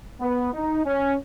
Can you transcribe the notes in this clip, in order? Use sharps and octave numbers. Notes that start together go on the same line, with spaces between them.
B3
D#4
C#4